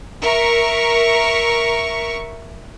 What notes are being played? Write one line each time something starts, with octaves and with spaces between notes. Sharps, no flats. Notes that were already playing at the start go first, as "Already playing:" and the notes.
A#4 E5 C#6